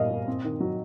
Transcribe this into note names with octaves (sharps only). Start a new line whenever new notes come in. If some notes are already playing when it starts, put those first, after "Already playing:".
Already playing: A#2 G3 B3 D#5 F5
A#2
C4
D#3
F#3